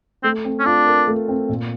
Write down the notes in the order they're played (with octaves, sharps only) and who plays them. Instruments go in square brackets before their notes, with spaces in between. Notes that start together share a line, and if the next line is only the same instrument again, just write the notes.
[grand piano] A3 [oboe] C4
[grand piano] C4
[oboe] C#4
[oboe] D4 [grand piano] F4
[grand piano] A#4
A3
C4
A#2